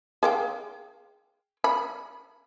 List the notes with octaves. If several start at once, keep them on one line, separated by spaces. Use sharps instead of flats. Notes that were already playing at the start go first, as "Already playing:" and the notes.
G#4 F5 G5
B5